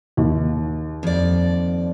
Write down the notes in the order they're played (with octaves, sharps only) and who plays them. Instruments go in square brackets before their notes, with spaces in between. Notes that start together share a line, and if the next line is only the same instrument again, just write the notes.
[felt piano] D#2
[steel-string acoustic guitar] F2 D5